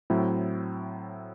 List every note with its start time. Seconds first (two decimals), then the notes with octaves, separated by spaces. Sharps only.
0.10 A2 F#3 C4 E4